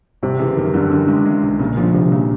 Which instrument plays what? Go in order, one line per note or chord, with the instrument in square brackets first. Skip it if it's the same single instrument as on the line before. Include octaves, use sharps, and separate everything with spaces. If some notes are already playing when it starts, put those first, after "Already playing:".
[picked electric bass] G#1 [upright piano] C3
[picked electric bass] C#3 [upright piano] E3
[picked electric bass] F#2 [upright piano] D#3
[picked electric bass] F#2 [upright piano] D3
[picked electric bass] C#4
G#3
G#3
B1
[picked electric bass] A#2 [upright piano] C#3
[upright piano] D3 [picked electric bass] F3
[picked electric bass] C2 [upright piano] C3
[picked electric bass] A#2 [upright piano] C#3